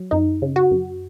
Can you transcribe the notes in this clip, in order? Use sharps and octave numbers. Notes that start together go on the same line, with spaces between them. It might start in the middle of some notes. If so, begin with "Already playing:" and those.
Already playing: F#3
F#2 D#4
C#3
F#4
F#2